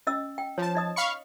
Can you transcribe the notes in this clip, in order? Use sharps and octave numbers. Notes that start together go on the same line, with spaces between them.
C#4 D#5 E6
G5
F3 C#5 A5
D#4 D#5 D#6
F5 B5 C#6